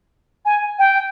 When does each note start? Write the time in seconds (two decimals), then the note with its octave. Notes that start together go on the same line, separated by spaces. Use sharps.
0.45 G#5
0.79 G5